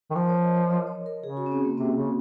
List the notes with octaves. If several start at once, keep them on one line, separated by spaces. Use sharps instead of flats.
D#3
F3 A#4
C#5
D#5
C#5
D#5
C#5
A#4
C#3 G#4
F#4
C#4
C4
A#3
C3 C4
C#3